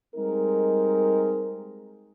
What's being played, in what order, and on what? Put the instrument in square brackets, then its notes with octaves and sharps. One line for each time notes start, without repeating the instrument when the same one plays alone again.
[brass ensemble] G3 G#3 C4 D#4 A#4